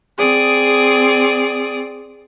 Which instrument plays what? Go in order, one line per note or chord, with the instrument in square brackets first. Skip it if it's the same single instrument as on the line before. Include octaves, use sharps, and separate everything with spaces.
[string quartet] C4 G#4 D5 D#6